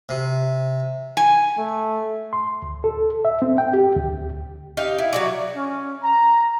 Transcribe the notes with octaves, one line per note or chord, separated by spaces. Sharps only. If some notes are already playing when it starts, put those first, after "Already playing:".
C3
G#5
A3
C6
D2
A4
E5
C4
G5
G4
D2
D#4 G4 F5
E4
F#3 F#4 D5
C#4
A#5